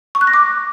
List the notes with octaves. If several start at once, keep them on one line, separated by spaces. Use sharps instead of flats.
C#6
F#6
A#6
D6